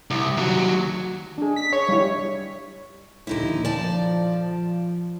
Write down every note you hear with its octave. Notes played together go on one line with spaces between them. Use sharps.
C2
D#2 F#3
D4 G#4
B6
C#5
G3 E4
A#1 D#2 D3 D#4 E4
F3 D5 A5